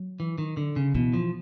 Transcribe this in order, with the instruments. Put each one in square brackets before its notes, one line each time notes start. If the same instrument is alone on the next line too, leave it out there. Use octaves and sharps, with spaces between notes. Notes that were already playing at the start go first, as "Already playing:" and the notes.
Already playing: [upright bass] F#3
[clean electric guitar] E3
D#3
D3
C#3
[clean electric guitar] B2 [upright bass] E3
[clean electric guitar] F3